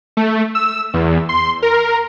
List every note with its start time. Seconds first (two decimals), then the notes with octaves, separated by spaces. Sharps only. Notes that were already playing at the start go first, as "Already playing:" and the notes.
0.17 A3
0.55 E6
0.94 E2
1.29 C6
1.62 A#4